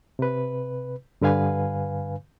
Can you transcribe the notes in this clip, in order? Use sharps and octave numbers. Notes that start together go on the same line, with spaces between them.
C3 B4
G2 D3 B4 F5 G#5